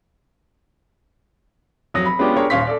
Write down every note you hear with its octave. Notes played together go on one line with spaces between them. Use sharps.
F1 F#3 D#6 A#6
B5
G#3 B3 C#4 D4 F4 G4
D4 G4 G#4 A#4 C#5
D#1 C#4 F5 C6 C#6 B6
A4 D5 F5